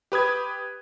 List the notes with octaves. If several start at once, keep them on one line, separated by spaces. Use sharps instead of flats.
G4 B4 D#6 G#6